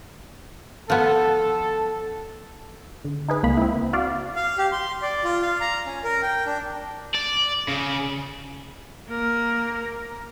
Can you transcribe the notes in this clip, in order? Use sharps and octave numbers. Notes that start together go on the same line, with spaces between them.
F3 B3 A4
D3
D#4 G#4 B4
C#2 A#3 B5
C4 E4
F#4 D5 F5
F5
G4
C6
D5
F4
F5
A#5
C#4
A#4
G5
D4
D5
C#3
A#3 A#4